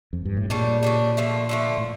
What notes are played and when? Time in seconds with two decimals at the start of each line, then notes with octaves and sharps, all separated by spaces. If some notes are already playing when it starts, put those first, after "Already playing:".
0.13 F2
0.25 G2
0.37 A2
0.50 A#2 C#3 G3 D4
0.83 C#3 G3 D4
1.17 D3 F3 A3
1.49 D3 F3 A3
1.78 A2